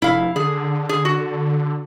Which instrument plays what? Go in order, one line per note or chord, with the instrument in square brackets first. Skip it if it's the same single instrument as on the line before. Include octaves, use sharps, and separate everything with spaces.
[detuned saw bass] F1 [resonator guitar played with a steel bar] E4 F5
[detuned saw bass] D3 [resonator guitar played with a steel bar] G#4
[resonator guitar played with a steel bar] G#4
F#4